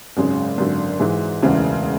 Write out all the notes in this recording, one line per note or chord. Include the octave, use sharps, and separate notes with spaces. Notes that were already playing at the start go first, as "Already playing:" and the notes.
G#1 F#2 C#3 G#3 C#4
G#1 F#2 D3
G#2 E3 G#3
E1 D2 C#3 E3